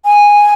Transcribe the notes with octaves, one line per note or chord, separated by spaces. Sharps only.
G#5